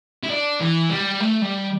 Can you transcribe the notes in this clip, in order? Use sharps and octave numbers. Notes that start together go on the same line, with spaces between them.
E4
D4
E3
G3
A3
G3